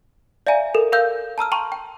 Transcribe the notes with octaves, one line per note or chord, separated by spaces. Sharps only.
D5 E5 F5 G#5 A#5
A4 A#4
A#4 F5 E6 G6
A5 A#5 E6 F6
G5 A5 A#5 C6 C#6
G5